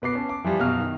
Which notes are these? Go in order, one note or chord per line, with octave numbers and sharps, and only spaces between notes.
B2 B3 D6 C7
C#4 A5
D6
E3 F3 G3
F#2 B2 F#3 F#4 F5 F6
D#3